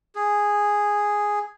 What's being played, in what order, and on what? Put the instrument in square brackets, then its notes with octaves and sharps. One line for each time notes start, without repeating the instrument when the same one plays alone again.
[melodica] G#4